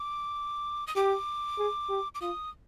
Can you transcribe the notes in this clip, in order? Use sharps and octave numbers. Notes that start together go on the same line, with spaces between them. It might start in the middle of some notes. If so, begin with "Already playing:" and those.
Already playing: D6
D#6
G4 D6
G#4
G4
D6
F4 D#6